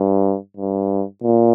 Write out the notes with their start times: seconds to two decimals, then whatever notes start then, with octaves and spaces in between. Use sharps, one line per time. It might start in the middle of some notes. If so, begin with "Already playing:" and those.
Already playing: G2
0.57 G2
1.24 A#2